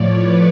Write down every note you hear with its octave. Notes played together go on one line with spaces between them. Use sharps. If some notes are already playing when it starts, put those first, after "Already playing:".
Already playing: A2 F3 C#5 D5
B4